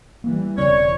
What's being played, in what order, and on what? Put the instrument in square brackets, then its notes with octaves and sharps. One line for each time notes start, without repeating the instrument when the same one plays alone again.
[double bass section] E3 G3 [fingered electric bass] A#3
[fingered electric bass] E1 C#3 C4 [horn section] C#5 [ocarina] D5